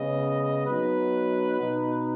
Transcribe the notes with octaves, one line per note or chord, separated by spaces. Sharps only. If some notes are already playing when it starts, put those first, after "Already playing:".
Already playing: C#3 G#3 B3 D#5
F#3 B3 D#4 B4
B2 B3 D#4